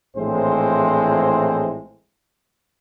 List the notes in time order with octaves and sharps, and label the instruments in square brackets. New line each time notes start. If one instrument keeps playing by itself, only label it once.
[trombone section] A#1 A2 E3 G#3 C4 C5